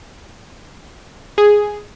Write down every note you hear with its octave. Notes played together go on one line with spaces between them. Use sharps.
G#4